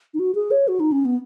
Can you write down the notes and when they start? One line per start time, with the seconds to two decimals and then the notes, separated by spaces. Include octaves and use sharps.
0.14 D#4
0.19 F#4
0.35 G#4
0.51 C#5
0.68 F#4
0.80 D#4
0.92 C#4
1.05 B3